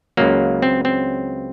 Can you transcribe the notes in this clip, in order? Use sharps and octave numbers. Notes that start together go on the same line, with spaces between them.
C#2 C#3 F#3 A#3
C4
C4